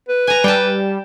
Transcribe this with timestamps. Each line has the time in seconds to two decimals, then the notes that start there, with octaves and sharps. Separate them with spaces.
0.08 B4
0.27 G#5 A#5
0.44 G3 G5 A5